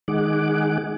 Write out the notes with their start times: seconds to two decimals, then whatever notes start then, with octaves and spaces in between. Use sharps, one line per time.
0.08 D#3 G#3 D#4 G#4 F#5 D6